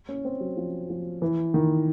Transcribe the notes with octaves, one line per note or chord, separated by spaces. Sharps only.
C#4
C4
F#3
F3
F3
E3
D#3